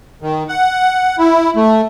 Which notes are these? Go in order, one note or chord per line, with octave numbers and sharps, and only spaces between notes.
D#3
F#5
E4
A3